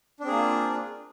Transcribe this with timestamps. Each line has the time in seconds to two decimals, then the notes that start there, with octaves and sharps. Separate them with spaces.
0.20 D4
0.24 C4
0.27 G#4
0.31 A#3
0.35 F4